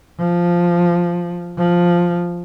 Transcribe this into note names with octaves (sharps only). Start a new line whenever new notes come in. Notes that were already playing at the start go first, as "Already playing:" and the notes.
F3
F3